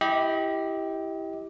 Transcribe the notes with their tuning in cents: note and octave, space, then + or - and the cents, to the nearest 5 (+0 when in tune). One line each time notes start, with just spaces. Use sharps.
E4 +0 G4 +0 D#5 +35